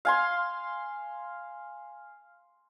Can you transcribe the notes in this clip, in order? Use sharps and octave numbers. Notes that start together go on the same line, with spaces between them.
F5 G#5 C6